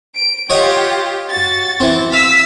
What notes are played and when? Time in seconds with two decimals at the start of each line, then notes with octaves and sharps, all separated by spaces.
0.15 D7
0.50 F4 G4 C#5 D#5 F#5
1.31 F#4 A6
1.80 E3 C4
2.12 F5 E6 B6